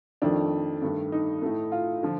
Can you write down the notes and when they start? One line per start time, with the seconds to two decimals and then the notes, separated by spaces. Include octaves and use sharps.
0.22 F2 D#3 A3 D4
0.82 G2 D#3 A3
1.12 D#4
1.42 A2 A3
1.72 F4
2.03 D3 F3